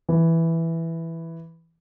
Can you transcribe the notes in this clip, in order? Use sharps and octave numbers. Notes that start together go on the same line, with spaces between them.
E3